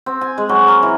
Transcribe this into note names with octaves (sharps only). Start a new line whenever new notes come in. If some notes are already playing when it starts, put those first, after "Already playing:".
C4
G#5
G#3
F#3
A#4
E3